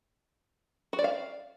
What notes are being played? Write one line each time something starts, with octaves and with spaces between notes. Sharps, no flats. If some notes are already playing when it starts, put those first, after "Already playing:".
F#4
D5
F5